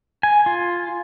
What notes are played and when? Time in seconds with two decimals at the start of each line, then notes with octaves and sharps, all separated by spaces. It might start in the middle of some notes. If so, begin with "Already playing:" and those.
0.23 G#5
0.46 F4